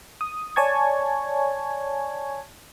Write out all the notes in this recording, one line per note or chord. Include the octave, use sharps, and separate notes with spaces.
D#6
C#5 D5 G#5 A5 C#6 G#6